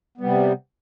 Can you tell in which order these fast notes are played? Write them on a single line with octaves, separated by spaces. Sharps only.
B3 G3 C3